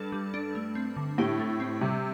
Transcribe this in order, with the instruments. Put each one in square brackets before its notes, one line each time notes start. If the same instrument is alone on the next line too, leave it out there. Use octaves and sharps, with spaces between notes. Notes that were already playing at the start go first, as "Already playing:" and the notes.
Already playing: [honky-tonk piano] G2 [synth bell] D4 A4
[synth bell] G3
D4
A3
C4
D3
[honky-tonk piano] A2 [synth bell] G4
[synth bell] A3
C4
[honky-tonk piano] C3 [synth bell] G3